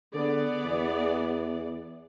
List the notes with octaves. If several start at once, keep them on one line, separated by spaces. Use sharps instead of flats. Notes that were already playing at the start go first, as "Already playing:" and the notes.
D3 B3 G#4 D5
E2